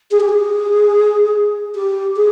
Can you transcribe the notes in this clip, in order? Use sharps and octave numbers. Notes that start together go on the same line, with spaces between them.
G#4
G4
G#4
G4
G#4